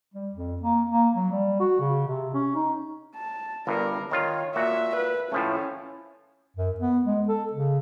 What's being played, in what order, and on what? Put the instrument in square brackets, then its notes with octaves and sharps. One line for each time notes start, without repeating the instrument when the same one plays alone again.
[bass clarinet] G3
F2
A#3
A#3
F#3
G3
F#4
C#3
C3
C#4
D#4
[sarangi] A5
[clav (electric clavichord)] G1 G2 [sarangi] A#4
[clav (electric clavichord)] D#3 F4 [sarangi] C#5
[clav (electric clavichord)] A#2 F#4 F#5 [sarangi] E5
[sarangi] B4
[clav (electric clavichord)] A2 F3 A3 [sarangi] C#4
[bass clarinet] F#2
B3
G#3
A4
C#3